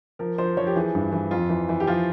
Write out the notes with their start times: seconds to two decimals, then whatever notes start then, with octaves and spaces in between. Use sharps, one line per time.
0.19 F3 A#4
0.38 F3 C5
0.57 F3 C#5
0.67 G4
0.76 E3 G#4
0.95 G2
1.12 E3
1.31 F2 F4
1.49 E3
1.69 E3
1.80 G4
1.87 F3 F4